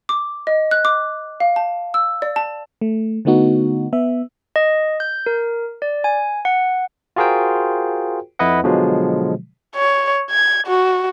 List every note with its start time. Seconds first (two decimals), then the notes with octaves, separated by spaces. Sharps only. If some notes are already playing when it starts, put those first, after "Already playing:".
0.09 D6
0.47 D#5
0.71 F#6
0.85 D6
1.40 F5
1.56 A5
1.94 E6
2.22 D5
2.36 A5
2.81 A3
3.25 D3 A3 B3 D#4 F#4
3.93 B3 E5
4.56 D#5
5.00 G6
5.26 A#4
5.82 D5
6.04 G#5
6.45 F#5
7.16 F4 F#4 G#4 A#4 C5 G5
8.39 F2 E4 B4 D#5 F#5
8.64 B2 D3 F3 F#3 G#3
9.75 C#5
10.30 G#6
10.67 F#4